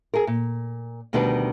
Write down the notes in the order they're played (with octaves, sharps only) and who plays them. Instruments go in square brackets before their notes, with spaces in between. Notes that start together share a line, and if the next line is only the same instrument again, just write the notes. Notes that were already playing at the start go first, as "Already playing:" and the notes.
[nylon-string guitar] G#4 A#4
A#2
D2 B2 D#3 G3 D4 B4